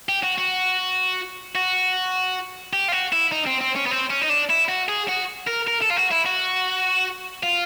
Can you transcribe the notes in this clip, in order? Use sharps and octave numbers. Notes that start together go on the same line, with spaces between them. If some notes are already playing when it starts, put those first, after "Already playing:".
G4
F#4
F#4
F#4
G4
F4
F#4
E4
D#4
C4
C4
C#4
B3
C4
C#4
D#4
D4
E4
F#4
G#4
F#4
A#4
A#4
A4
F4
F#4
E4
F#4
F4